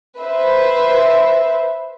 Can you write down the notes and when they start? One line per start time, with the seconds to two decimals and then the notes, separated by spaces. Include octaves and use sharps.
0.19 B4 C5 E5